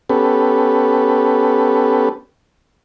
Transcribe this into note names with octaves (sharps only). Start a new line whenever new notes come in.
B3 C#4 G4 A4 B4